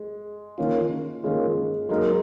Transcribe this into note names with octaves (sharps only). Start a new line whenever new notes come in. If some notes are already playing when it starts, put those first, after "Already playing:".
Already playing: G#3
D#3 A#3 C#4 F4
D#3 G#3 A#3 C#4 F4
F#3 G#3 A#3 D#4 A#4